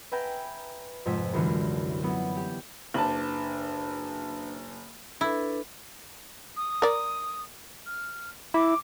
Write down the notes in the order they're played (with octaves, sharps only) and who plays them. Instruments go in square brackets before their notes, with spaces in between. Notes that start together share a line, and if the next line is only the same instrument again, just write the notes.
[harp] B4 E5 G5 G#5 A#5
F2 G#2 C3 G#5 E6 B6
C2 F#2 D3 E3
F#3 B3 E4
G4
[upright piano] F#1 A5 [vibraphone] D4 B4
[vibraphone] D4 A4 B4 [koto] E4
[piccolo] D#6
[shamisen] A#4 D5
[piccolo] F6
[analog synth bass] E4 [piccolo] D6